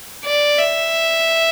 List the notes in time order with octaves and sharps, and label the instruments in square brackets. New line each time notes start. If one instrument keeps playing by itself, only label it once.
[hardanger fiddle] D5
E5